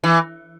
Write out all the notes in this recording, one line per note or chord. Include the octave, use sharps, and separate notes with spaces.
E3